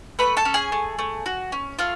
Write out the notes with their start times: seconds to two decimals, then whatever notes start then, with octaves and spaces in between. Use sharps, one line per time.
0.19 A3 B4 B5
0.37 A4 A5
0.45 C#4
0.54 G#4 G#5
0.72 A3
0.99 A3
1.26 F#4
1.52 C#4
1.79 A3 F4 F5